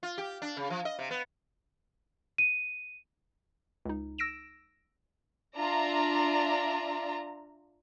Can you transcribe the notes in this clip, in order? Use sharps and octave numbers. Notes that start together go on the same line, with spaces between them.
F4
G4
D4
C#3
F3
D#5
C3
B3
D#7
C#2 D#4
E6 A#6 D7 E7
D4 F4 D5 E5 A#5